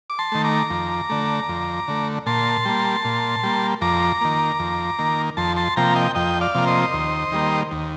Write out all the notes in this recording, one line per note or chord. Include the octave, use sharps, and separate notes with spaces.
D6
A5 C6
D#3 A3
A#5 D6
F2
D3 A3
F2
D3 A3
A#2 A5 C6
G3 A#3
A#2
G3 A#3
F2 A#5 D6
D#3 A#3
F2
D#3 A#3
F2 A5 C6
A5 C6
C3 F3 A#3 G5 A#5
D#5 G5
F2 D#5 G5
D5 F5
C3 F3 A#3
C5 D#5
D#2
D#3 G3 A#3
D#2